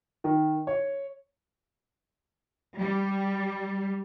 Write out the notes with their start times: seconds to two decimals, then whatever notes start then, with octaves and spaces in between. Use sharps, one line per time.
0.24 D#3
0.67 C#5
2.78 G3